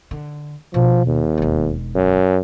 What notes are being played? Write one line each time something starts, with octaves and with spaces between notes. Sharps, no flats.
D3
B2 F3
D#2
E1 D#4
F#2